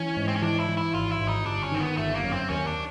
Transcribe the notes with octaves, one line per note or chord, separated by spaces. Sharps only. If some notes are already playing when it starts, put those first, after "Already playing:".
Already playing: E3 C#4
G#2
C4
C#4
E3 D4
E4
E3
E4
G#1 F4
E4
G#1
D#4
G1 D4
C#4
D#3 C4
B3
G1 A3
A#3
F#2
C4
D#2 C#4
D4